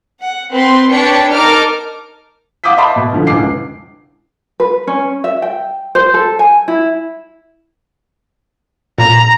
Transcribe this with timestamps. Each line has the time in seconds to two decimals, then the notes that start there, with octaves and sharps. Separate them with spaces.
0.20 F#5
0.51 C4 B4 C6
0.91 D4 B4 C#5 G5 C#7
1.31 D#4 A#4 A5 D6 F6 D7
2.64 F5 F#5 D6 D#6 G6 B6
2.77 D#5 E5 A5 B5 C6 D6
2.96 B2
3.12 C#2 D3 F3
3.27 E1 C#2 D3 E3 D6 C7
4.60 B4
4.87 C#4
5.24 E5
5.42 G5
5.95 C5
6.14 A4
6.39 G#5
6.68 E4
8.98 A#2 A#5